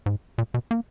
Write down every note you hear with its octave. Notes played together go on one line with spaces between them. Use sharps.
G#2
A#2
B2
A#3